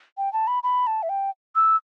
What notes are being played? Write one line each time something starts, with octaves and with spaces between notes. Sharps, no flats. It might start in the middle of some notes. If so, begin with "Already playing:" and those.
G5
A5
B5
B5
A5
E5
G5
E6